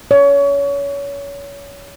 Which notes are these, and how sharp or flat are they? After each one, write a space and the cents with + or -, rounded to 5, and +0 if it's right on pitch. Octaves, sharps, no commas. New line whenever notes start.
C#5 +25